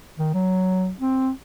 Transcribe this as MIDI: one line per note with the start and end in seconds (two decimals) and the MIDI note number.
0.19 0.29 51
0.34 0.91 54
1.01 1.30 60